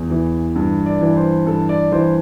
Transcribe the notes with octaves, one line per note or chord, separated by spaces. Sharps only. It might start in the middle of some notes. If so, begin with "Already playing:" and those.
Already playing: E2
E3
G2
D5
E3
C5
G2 A4
D5
E3 C5